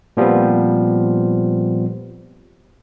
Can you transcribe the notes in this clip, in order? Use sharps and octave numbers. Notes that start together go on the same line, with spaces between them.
A#2 F3 G3 B3 C4